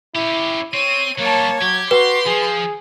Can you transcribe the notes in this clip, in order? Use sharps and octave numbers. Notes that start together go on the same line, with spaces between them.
C#4 E4 G4
C4 C#5 D#7
F#3 G3 A#3 C#5 A5
F#3 G4 G#6
F#4 B4 C6
F3 G#4